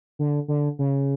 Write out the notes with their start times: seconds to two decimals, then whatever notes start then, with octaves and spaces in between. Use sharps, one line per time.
0.19 D3
0.48 D3
0.79 C#3